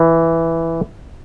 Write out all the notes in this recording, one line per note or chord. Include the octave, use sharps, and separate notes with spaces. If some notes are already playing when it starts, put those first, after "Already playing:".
Already playing: E3